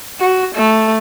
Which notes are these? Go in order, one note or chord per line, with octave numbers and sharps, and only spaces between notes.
F#4
A3